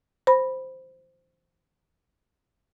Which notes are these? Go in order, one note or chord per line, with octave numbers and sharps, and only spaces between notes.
C5 B5